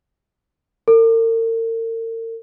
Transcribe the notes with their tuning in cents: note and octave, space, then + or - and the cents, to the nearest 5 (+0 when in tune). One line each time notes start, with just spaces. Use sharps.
A#4 -45